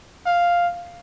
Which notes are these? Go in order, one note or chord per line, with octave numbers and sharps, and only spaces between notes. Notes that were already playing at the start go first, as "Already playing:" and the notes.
F5